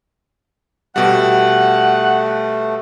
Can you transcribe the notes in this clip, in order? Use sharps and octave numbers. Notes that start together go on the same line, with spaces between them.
B2 G3 A3 F#5